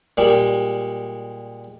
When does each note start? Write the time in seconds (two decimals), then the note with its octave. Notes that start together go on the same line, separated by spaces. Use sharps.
0.17 A#2 G3 G#3